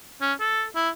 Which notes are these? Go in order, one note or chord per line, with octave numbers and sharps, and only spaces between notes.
C#4
A4
E4